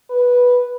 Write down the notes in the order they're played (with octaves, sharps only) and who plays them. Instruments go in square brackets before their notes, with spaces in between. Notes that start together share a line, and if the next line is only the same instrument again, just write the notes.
[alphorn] B4